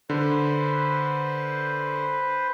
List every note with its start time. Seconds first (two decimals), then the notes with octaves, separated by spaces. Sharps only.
0.10 D3 B4 C5